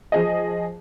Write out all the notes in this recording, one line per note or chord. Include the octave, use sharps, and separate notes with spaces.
F3 G#4 D#5